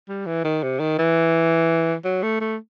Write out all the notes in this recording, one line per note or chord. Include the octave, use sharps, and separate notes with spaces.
G3
E3
D#3
C3
D#3
E3
F#3
A3
A3